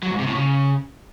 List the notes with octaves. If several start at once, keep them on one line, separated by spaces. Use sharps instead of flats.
F#3
G#2
C3
A2
C#3